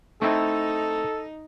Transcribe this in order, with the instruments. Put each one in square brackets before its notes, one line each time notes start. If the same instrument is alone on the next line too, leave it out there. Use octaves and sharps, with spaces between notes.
[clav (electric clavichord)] A3 C4 E4 [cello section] D#4 [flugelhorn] A4